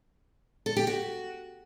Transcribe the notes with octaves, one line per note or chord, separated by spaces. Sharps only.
A4
G4
F#4